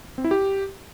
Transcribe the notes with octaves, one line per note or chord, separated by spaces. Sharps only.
C4
E4
G4